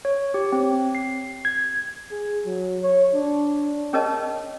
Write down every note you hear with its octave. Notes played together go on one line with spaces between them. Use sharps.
C#5
G4
C4
C7
G#6
G#4
F#3
C#5
D4
C#4 G#4 A#4 C#5 D#5 A5